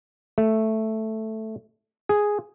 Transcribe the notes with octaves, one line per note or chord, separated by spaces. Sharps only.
A3
G#4